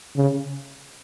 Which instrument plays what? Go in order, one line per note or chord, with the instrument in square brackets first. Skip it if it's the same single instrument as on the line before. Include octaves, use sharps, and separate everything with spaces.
[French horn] C#3